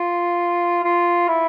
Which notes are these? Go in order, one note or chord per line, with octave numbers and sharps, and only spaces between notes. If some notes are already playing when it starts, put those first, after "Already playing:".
Already playing: F4
F4
E4